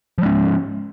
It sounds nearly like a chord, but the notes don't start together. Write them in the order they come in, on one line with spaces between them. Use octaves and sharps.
F3 G#3 C#4